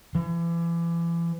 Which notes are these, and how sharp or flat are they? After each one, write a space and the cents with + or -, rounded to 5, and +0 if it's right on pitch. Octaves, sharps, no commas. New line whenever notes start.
E3 +35